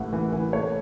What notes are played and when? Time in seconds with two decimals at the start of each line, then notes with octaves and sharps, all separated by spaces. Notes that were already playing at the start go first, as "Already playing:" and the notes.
Already playing: A1 A2 F#5
0.13 E3
0.33 E3
0.53 A3 C#5